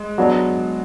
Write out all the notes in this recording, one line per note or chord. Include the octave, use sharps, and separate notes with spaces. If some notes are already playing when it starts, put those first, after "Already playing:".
Already playing: G#3
F#3 B3 D4